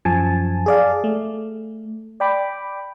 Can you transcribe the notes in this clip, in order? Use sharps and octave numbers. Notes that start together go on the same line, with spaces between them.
F#2 F3 G#5 A5
G#4 D5 F5
A3
D5 G5 B5 D6